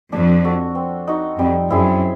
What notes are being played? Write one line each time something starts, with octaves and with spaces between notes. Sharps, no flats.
F2 D4
F#4 A4
C4
D#4 F#4
F2 G3
F#2 C4 E4 G#4